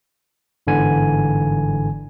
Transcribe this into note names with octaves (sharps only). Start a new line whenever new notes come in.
G1 G#2 D3 E3 G#5